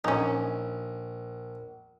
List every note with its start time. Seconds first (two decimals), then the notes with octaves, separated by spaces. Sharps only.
0.04 A#1 C#4 D#4